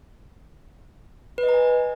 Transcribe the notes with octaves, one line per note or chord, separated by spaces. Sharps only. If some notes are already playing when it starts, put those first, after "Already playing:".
B4
D#5
A#5
G#5